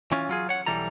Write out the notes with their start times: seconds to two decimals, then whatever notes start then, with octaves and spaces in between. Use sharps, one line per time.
0.12 E3 C#4 F4
0.29 F#3 F4 G#4
0.49 C#5 F#5
0.66 B1 E3 G3 A4 A#5